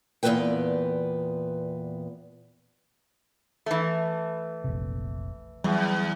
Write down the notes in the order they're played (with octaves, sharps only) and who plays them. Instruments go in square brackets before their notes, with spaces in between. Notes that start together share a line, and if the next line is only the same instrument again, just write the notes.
[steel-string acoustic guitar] E2 A#2 F3 B3 B4 G5
[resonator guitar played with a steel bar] E3 A3
[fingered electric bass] F1 A#1 C3
[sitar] E2 [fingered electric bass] F#3 G3